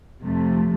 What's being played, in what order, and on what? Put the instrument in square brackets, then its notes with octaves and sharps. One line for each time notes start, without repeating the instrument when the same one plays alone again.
[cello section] F2 C3 F3 A3